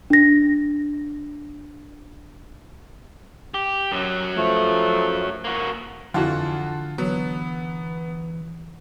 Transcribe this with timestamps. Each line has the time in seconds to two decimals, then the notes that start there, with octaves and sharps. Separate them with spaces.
0.10 D4 A#6
3.54 G4
3.92 F#2 F#3
4.37 F3 A3
5.44 A#3 F#4
6.14 F2 D3 E3 F4 F#4 F#5 A5
6.98 E3 F#3 B3